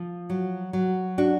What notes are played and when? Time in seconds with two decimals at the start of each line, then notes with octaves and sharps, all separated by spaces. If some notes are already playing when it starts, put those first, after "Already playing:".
Already playing: F3
0.30 F#3
0.73 F#3
1.18 D4 F#4